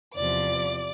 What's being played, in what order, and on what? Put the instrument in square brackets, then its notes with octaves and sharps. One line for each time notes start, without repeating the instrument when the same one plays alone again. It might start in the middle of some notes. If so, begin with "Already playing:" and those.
[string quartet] E2 C3 F3 D5 D6